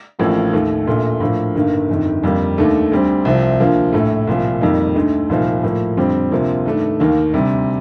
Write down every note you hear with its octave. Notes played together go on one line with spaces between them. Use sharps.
A1 A2 F3 A#3 D4
D#2 D#3 A3
A#1 A#2 A3
A2 F3 A#3 D4
G1 G2 D#3 A#3
G1 F2 D#3
F2 D3 G3 A#3
D#2 D#3 A3 D4
D2 D3 G3 C4
C2 C3 F3 C4
D2 D3 F3 A#3
A#1 A2 A3
C2 A#2 F3
F2 D#3 G3 A#3 D#4
D2 D3 A3 D#4
C2 A#2 F3 A#3 D#4
A2 F3 A#3
F2 D3 G3 C4
D2 C3 F3 A#3
G2 D#3 A3 D4
D#2 D#3 A#3
D2 C3 G3